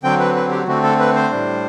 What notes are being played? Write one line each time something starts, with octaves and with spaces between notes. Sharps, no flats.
D3 F#3 C4 G5
B4
B4
G4
D3 A3 C4 F#4
A4
B4
C5
A2 G3 D4